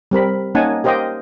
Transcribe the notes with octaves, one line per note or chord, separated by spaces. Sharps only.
G3 C4 A#4 B5
A#3 C#4 D#4 F#5 G#5 A5
G4 A#4 C5 D#5 F5 G5